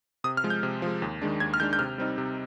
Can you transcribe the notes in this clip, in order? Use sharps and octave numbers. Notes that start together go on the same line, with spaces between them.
C3 D#6
F6
F3 G#3
G6
C3
F3 G#3
D#2
D#3 G#3 D4
D#2 G#6
F6
D#3 G#3 D4 G6
G6
C3 F6
G3 C4 D#4
C3